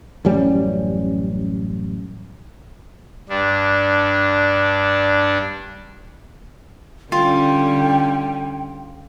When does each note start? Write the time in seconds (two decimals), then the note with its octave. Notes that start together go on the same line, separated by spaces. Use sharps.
0.25 A1 F#2 G3 C#4
3.29 G2 D4
7.12 D3 G3 C#4 F4 G5